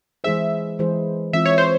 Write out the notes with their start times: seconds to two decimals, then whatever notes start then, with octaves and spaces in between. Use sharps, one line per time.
0.24 E3 G#3 E4 G#4 C5 E5
0.79 E3 G#3 E4 G#4 C5
1.33 E3 G#3 C4 F4 E5
1.46 C#5
1.58 C5